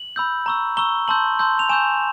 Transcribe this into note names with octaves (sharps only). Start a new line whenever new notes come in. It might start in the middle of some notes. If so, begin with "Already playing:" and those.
Already playing: F#7
B5 E6 G6
A#5 C#6 E6
A#5 C#6 E6 G7
A5 C6 E6 G6 F#7
A5 C6 E6 G6
F7
G#5 C#6 E6 G6 E7